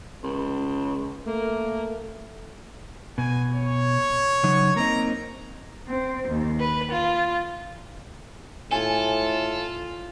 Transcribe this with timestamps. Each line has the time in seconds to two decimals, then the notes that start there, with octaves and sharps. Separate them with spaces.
0.23 C#2
1.27 A3 A#3
3.18 B2 G#5
3.55 C#5
4.43 C#3 F#3 D#4
4.76 A#3 C4 D#4 A#5
5.89 C4
6.29 D#2
6.61 B4
6.92 F4
8.71 A2 F4 A4 G#5